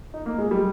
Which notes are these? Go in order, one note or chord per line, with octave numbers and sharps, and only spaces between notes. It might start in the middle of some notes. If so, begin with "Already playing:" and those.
D#4
A#3
G#3
G3